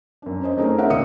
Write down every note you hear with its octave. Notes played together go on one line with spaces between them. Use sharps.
F#2 D4
C#4 C5 D#5
A3 C4 D#4 G#4 A#4 C#5
C#4 F4 A#4 C#5 E5 F#5
D#2 A#2 C#3 D#6 E6 C#7